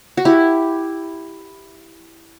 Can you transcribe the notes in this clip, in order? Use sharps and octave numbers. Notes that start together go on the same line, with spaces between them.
F#4
E4 G4